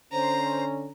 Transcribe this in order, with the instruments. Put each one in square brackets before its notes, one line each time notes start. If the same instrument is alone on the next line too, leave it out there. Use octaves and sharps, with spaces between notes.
[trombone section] D3 C#4 [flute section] C5 [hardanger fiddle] A#5